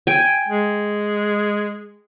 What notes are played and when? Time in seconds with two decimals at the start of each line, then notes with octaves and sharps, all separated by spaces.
0.07 G5 G#5
0.48 G#3